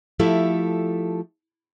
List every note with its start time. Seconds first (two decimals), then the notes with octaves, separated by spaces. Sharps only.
0.19 F3 A3 E4 G4 A4